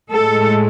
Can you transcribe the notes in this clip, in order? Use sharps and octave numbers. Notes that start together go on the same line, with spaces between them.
A2 G#3 A4